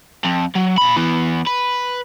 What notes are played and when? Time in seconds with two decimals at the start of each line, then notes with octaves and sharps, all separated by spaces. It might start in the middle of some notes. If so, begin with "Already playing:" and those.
0.24 F2
0.55 F#3
0.78 A#2 B5
0.96 E3 B3
1.47 B4